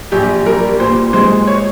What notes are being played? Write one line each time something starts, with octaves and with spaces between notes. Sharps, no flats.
A#1 G4
G3 A#4
A#2 C5
G#3 C5
C#5